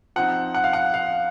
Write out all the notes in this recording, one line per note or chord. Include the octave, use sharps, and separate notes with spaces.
F3 C4 D#4 F#5
F#5
F5
F#5
F5